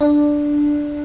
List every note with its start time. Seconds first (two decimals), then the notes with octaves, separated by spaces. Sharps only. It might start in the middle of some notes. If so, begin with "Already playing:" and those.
0.01 D4